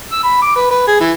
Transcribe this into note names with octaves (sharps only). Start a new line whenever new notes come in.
E6
B5
D6
B4
B4
G#4
E3